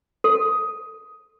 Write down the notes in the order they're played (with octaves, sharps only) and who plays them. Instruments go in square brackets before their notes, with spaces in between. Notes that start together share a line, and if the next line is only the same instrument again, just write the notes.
[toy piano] A4